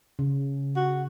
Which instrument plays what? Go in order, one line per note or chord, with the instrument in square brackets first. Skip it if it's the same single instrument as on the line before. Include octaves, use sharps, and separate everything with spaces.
[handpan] C#3
[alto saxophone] F#4